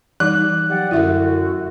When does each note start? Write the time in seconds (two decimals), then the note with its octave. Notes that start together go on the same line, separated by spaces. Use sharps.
0.20 E3 G3 D#4 F#6
0.70 F#3 G4 D5 F#5
0.91 F#2 D3 E4 F#4 E5